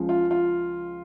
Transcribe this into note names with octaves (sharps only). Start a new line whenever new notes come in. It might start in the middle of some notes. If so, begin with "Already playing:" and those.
Already playing: C#2 C#3 F3 G#3
F4
F4